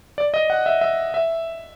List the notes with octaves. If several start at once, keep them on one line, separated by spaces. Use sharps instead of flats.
D5
D#5
F#5
E5
E5
E5